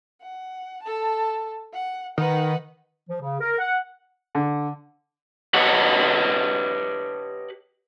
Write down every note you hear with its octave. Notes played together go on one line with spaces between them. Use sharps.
F#5
A4 A5
F#5
D#3 B4 F#5
F3
C#3
A#4
F#5
D3
G4 B4 C#5 D#5 F#5